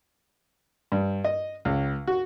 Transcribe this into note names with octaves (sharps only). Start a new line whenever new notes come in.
G2
D#5
C#2
F#4